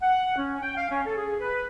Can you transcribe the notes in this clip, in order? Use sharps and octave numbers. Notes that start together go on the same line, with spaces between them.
F#5
C#4
G5
F5
C#4
A4
G#4
B4